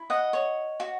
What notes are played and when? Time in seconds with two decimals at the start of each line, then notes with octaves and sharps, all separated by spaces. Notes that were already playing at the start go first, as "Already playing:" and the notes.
Already playing: E4
0.10 D#5 F#5
0.33 C#5
0.80 F#4